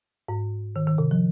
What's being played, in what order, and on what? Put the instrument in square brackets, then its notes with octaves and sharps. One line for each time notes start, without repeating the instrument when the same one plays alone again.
[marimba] G#2
D#3
D#3
C3
F3